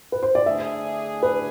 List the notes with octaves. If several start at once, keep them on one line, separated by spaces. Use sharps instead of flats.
B4
C5
D5
D3 A3 D4 G#4 E5
B4